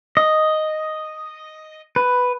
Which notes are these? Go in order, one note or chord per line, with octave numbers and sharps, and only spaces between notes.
D#5
B4